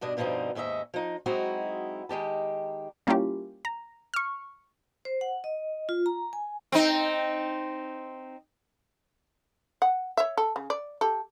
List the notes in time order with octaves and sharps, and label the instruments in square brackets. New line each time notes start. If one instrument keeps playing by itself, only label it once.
[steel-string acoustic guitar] G2 B2 D4 D#5
G2 B2 D3 F3 C4 D#4
D#2 G#2 C#4 D#5 E5
F3 D#4
F#3 G#3 C4 D#4 E4 F#4
D#3 G#3 G4 A5
[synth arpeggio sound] G3 A#3 C#4 E4 F4 G4
A#5
C#6 F6
[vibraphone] C5
F#5
D#5
F4
A#5
G#5
[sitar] C4 D#4
[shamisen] F#5
C#5 E5
A4
C#3
D5
G4 A4